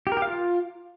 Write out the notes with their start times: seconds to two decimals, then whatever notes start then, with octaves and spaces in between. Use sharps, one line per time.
0.07 G4
0.12 A#4
0.17 G4
0.22 F5
0.27 F4